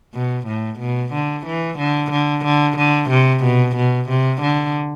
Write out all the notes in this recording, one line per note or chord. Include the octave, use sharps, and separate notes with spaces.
B2
A2
B2
D3
E3
D3
D3
D3
D3
C3
B2
B2
C3
D3